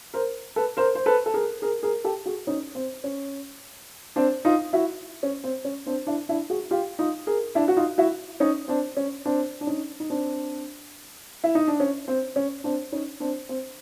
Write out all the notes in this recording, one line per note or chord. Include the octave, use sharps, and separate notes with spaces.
A#4 C5
A4 B4
A#4 C5
C5
A4 B4
A4
G#4 A#4
G#4 A#4
G#4 A#4
G4 A4
F#4 G#4
C#4 D#4
C4
C#4
C4 D4
D#4 F4
E4 F#4
C#4
C4
C#4
C4 D4
D4 E4
D4 E4
F#4 G#4
F4 G4
D#4 F4
G#4 A#4
D4 E4
F#4
D#4 F4
E4 F#4
C#4 D#4
C4 D4
C#4
C4 D4
D4
C#4 D#4
D#4
C4 D4
E4
D#4
D4
C#4
C4
C#4
C4 D4
C#4 D#4
C4 D4
C4